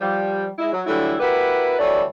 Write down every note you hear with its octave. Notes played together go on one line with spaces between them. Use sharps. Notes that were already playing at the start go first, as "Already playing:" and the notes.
F3 G3
G#3 E4
F#3
D3 E3 F#3 G3 A3 E4
E4 F#4 G4 A#4 B4
D2 E3 G3 A4 C#5 D5